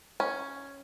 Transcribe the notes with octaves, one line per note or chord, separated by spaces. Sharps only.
C#4